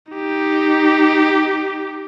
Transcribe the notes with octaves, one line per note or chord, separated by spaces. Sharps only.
D#4 G4